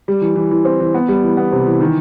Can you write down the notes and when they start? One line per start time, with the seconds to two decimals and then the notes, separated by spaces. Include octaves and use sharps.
0.08 G3
0.21 E3
0.36 E3
0.51 E3
0.65 C4
0.80 E3
0.95 B3
1.08 G3
1.23 E3
1.37 B3
1.52 C3
1.67 E3
1.81 D#3